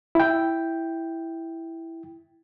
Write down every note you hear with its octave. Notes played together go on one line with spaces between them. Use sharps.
E4 G5